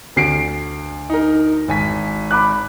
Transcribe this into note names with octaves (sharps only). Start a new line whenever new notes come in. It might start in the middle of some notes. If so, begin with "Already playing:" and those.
D2 C7 D7
D#4 A#4
G#1 G#5 B6
B5 D6 F#6